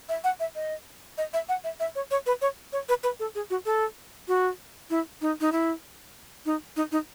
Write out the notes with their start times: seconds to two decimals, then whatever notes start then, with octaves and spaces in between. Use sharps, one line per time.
0.09 E5
0.24 F#5
0.40 E5
0.55 D#5
1.18 D#5
1.33 E5
1.49 F#5
1.64 E5
1.80 E5
1.95 C#5
2.11 C#5
2.26 B4
2.42 C#5
2.73 C#5
2.89 B4
3.03 B4
3.20 A4
3.35 G#4
3.50 F#4
3.66 A4
4.28 F#4
4.90 E4
5.21 D#4
5.41 D#4
5.52 E4
6.46 D#4
6.76 D#4
6.92 D#4